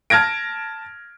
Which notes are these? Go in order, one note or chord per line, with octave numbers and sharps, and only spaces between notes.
A5 F6 G#6 A#6 D7